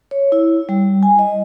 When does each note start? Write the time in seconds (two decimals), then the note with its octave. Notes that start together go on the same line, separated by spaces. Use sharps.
0.11 C#5
0.32 E4
0.69 G3
1.03 G#5
1.19 D#5